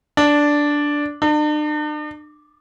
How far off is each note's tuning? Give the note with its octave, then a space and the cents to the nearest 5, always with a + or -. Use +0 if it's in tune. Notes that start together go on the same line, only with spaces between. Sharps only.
D4 -5
D4 +45